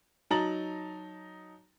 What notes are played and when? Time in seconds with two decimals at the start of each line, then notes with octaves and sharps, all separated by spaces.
0.30 F#3 D#4 A5 A#5 A6 F#7